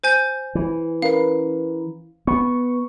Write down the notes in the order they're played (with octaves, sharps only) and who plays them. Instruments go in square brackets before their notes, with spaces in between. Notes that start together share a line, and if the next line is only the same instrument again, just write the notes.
[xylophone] C5 G#5 G6
[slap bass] E3
[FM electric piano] C#4 A#4 B4 [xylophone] F5
[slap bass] B3 [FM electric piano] C#6